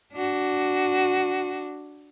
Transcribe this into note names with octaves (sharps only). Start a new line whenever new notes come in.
D4 F#4